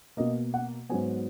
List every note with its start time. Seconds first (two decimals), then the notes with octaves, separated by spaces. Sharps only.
0.17 B2 A#3 D#5
0.54 F#5
0.89 G#2 F#3 B3 G#5